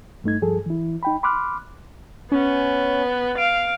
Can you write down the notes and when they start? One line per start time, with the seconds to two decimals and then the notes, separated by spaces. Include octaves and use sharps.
0.24 G2 A3 D#4 G#6
0.41 G2 F3 G#4 A4
0.66 E3 E4
1.03 D#4 G5 B5
1.23 B5 C6 D6 F6 F#6
2.32 B3 C#4
3.38 F5 D7